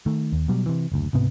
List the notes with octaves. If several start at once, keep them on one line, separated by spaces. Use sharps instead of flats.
D#3 A3
D#2
B2 F#3 G3
C3 E3
F#1 D2
C#2 G#2 C3 B3